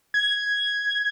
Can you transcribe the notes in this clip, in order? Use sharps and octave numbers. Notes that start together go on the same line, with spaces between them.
G#6